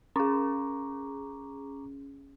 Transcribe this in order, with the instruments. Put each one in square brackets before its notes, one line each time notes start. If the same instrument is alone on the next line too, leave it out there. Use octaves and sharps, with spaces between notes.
[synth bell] C#4 G#4 [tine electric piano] A#5 C#6 D6